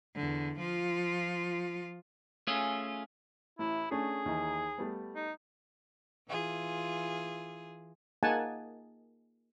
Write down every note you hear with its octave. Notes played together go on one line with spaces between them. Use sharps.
E2 D3
F3 F4
A3 C#4 F4 G#4
A1 E4
A3 C#4 D4 G#4
D#2 E3 D#4
G3 A3 B3
D#4
E3 F4 G#4
A#3 D#4 G#4 F#5 G#5 A5